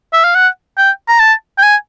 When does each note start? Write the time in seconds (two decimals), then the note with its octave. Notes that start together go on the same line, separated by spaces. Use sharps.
0.13 E5
0.24 F5
0.35 F#5
0.78 G5
1.08 A#5
1.20 A5
1.58 G5
1.63 G#5